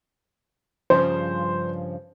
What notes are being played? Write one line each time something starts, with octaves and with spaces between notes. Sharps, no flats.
G2 C#3 F3 C5